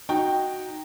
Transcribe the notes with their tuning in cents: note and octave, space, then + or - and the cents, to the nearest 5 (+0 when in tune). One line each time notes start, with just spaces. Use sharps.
D#4 -5 F#4 +0 G5 +0